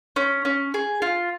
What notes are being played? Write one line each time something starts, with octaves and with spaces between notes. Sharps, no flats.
C#4
C#4
G#4
F4